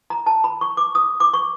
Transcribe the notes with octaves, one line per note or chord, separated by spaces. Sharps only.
A#5
A5
B5
C#6
D6
D#6
D6
C#6